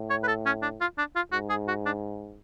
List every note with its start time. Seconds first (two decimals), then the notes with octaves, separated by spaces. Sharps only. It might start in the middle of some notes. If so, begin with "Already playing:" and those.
Already playing: A2
0.10 C#5
0.23 B4
0.28 A4
0.46 C#4
0.62 D4
0.81 F4
0.98 D4
1.16 F4
1.32 G#2 F#4
1.49 G#4
1.68 F#4
1.85 D4